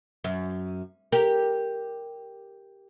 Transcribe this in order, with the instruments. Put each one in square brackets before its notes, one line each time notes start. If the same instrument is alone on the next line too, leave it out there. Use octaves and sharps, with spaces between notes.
[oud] F#2
G4 A#4